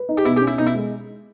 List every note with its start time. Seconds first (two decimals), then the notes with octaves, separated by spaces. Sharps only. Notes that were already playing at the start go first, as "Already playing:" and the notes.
Already playing: B4
0.09 D#4
0.17 G4
0.25 B2 E4
0.36 G4
0.41 C#4
0.47 E4
0.58 B2 D#4
0.67 E4
0.75 G#3